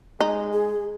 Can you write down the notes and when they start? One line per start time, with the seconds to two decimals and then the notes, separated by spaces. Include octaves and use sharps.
0.20 G#3 D#4
0.53 G#4